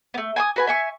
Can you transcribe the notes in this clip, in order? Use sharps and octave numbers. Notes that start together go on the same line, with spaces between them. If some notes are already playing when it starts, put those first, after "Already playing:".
A3 B3
G#5 C6 D#6
F#4 B4 G#5
E5 G#5 C#6